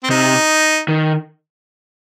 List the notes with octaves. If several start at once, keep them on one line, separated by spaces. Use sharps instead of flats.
C4
C3 D#4
D#3